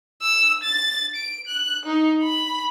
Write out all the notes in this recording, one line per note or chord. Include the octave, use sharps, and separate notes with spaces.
E6
A6
D7
F#6
D#4
B5